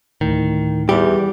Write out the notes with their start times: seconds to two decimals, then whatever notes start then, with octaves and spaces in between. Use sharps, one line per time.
0.21 D2 A2 D#3
0.89 E2 G3 G4